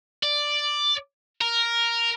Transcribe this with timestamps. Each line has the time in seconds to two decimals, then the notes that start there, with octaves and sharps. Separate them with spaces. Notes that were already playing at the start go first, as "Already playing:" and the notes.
0.23 D5
1.41 A#4